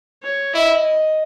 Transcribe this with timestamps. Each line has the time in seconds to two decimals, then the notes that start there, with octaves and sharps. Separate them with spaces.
0.23 C#5
0.54 E4 D#5